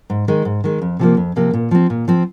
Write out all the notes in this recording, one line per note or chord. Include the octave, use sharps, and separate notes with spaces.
G#2
D#3 G#3
G#2
D#3 G#3
F2
C3 F3 A#3
F2
C3 F3 A#3
A#2
F3 C4
A#2
F3 C4